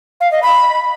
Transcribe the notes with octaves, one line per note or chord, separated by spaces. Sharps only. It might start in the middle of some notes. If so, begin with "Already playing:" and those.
F5
D#5
B5